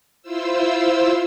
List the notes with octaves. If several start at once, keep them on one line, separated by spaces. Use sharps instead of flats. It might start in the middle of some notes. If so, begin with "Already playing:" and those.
E4 F4 C5 E6